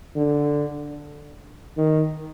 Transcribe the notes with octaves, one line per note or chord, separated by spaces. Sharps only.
D3
D#3